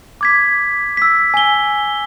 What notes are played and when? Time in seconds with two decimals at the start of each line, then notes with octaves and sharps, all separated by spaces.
0.21 D6 G#6 B6
0.97 E6 B6
1.34 G#5 G7